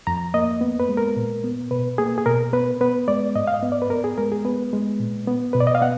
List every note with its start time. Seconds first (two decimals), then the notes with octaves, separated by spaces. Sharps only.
0.07 F2 A#5
0.34 A#3 D#5
0.61 B3
0.80 B4
0.89 G#3
0.97 A#4
1.16 A#2
1.44 B3
1.71 B2 B4
1.98 A#3 G#4
2.18 G#4
2.26 B2 A#4
2.53 B3 B4
2.81 B3 B4
3.08 G#3 D5
3.36 G#2 D#5
3.47 F5
3.54 D#5
3.62 B3
3.72 D5
3.82 B4
3.90 B3 A#4
4.04 G#4
4.18 G#3 A#4
4.32 G#4
4.45 B3 B4
4.73 G#3
5.00 A#2
5.27 B3
5.53 B2 B4
5.60 D5
5.67 D#5
5.75 F5
5.82 B3 F#5